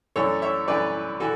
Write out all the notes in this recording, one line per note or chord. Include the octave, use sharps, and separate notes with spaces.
F#2 E3 A3 D4 A4 C#5
C#5 E5
F#2 E3 A3 D4 B4 D5
E3 F#4 A4